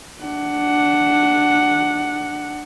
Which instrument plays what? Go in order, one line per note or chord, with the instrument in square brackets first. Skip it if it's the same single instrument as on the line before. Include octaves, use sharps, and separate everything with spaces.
[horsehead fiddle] D4 F#5